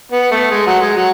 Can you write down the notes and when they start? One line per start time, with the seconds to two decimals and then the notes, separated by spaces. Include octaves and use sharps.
0.12 B3
0.31 A3
0.51 G#3
0.66 F#3
0.81 G#3
0.97 F#3